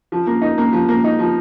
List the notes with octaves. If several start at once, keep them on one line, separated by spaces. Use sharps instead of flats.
F3
A#3
D#4
A#3
F3
A#3
D#4
F3